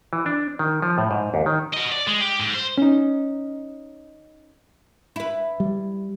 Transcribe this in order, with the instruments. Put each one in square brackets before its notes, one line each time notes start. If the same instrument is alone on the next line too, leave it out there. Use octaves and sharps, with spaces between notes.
[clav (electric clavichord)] E3
D4
D#3
F3
A2
G#2
D#2
D#3
[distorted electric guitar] F#4 D#5
D5
G#3
G4
G#2
C5
[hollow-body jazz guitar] C#4 D#4
[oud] E4 B4
[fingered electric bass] G3